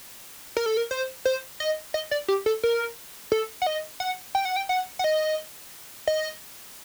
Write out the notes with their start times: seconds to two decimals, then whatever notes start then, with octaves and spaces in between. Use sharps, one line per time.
0.57 A#4
0.66 A4
0.77 A#4
0.91 C5
1.25 C5
1.60 D#5
1.94 D#5
2.11 D5
2.28 G4
2.46 A4
2.63 A#4
3.32 A4
3.62 F#5
3.67 D#5
4.00 F#5
4.35 G5
4.45 F#5
4.56 G5
4.69 F#5
4.99 F#5
5.04 D#5
6.08 D#5